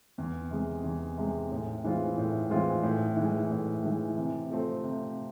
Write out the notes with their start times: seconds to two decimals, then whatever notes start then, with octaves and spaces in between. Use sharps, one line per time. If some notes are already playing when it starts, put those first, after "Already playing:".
0.18 E2
0.51 C3 G#3
0.84 E2
1.18 C3 G#3
1.52 A2
1.84 E3 G#3 C4 F4
2.18 A2
2.50 E3 G#3 C4 F4
2.83 A2
3.17 E3
3.22 G#3
3.51 A2
3.83 E3 G#3
4.17 C3
4.51 F3 A3 C4
4.84 C3